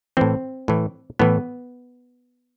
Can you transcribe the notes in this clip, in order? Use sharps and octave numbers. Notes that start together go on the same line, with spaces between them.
A2 E3 C4
A2 E3
A2 E3 B3